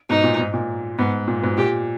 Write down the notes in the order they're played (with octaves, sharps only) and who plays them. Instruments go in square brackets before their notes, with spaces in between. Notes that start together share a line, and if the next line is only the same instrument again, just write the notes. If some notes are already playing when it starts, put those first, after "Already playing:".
[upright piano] G#2 B2 [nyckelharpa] D#4
[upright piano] A#2
G#2
A#2
[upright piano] G#2 [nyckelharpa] B3
[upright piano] A#2
G#2 B2
[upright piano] A#2 [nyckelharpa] G4